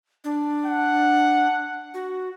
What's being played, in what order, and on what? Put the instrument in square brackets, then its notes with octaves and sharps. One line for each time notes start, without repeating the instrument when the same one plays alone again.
[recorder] D4
[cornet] F#5
[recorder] F#4